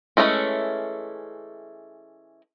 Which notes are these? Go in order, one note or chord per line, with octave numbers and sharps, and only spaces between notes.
E3 F3 G#3 A3 C#4